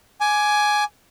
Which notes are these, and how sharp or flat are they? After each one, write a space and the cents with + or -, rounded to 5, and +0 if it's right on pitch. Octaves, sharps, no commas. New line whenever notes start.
G#5 +10 D6 +0